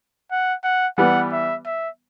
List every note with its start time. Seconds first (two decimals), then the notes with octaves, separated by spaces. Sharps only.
0.31 F#5
0.64 F#5
0.98 E3 G3 B3 F#5
1.32 E5
1.65 E5